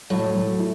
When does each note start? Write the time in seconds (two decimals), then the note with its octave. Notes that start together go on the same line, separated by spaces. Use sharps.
0.10 A2 F#3
0.34 F#3
0.59 E4